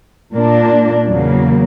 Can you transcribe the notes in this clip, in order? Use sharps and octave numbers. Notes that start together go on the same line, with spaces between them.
A#2 A#3 D4
E2 C#3 F#3 A#3